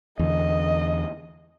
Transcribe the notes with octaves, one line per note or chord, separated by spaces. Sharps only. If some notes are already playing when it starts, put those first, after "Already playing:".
E2 D3 D#5